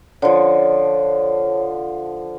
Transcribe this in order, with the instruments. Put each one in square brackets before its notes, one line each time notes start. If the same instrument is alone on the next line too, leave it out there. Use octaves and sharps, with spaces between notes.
[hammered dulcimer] D3 F3 [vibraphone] C#5